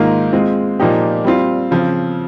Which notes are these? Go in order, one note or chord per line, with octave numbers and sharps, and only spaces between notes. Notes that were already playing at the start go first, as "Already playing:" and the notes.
Already playing: G#2 D#3 A#3 F4 A#4
G#3 C4 F4
A#2 F3 A#3 D#4 G4
G3 C4 F4
C#3 F3 C4